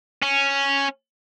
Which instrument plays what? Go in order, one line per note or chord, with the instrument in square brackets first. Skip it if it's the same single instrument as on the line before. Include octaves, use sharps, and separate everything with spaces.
[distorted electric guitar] C#4